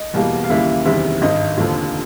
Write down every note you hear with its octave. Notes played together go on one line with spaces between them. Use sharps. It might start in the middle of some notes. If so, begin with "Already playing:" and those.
Already playing: D#5
E2 B2 G3 A#3
F5
D#2 C#3 E3 G3 A#3 E5
F#1 E2 C3 D#3 G3 E5
G#1 G2 D#3 D#5
F1 D#2 D3 F3